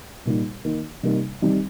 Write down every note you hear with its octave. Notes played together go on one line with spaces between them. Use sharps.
A#2 G3 A#3 D#4
D#3 A#3 D#4
C3 G3 A#3 D#4
D#3 G3 C4